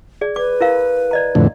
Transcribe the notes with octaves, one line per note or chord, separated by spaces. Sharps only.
G#4 D5
B4 D5 D6
E4 A#4 F5
D5 D#5 A#5
F2 A2 D3